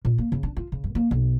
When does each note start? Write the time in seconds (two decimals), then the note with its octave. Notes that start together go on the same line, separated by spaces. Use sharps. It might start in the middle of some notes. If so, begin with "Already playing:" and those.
0.05 A#2
0.18 A#3
0.32 C#3
0.43 D4
0.57 F4
0.72 C#3
0.84 G2
0.95 A#3
1.11 B1